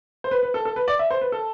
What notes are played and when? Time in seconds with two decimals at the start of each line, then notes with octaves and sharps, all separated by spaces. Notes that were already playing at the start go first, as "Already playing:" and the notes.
0.24 C5
0.31 B4
0.43 B4
0.54 A4
0.65 A4
0.76 B4
0.88 D5
0.99 E5
1.11 C5
1.21 B4
1.32 A4